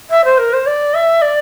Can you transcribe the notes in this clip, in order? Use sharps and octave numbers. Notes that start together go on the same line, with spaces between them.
E5
C5
A#4
C5
D5
E5
D5